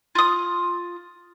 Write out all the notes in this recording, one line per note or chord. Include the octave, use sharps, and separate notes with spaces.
F4 D#6